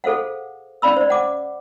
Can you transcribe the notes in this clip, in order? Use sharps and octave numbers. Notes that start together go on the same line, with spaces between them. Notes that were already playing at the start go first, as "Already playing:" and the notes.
G#4 A4 C5 F5 F#5
C#4 D5 F5 B5 E6
C5 D5
F#5 D6